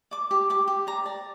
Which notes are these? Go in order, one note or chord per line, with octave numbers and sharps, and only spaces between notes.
D5 D6
G4
G4 D6
G4
D5 A#5
D5